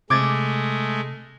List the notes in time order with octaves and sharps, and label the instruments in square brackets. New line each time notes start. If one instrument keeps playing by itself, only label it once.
[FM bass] C3 [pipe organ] G#3 A3 [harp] D6 G#6 A6